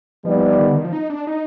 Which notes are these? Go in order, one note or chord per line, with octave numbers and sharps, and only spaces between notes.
F3 G3 B3 D#4 B4 D5
D#3
D3
D#3
F3
D#4
D4
D#4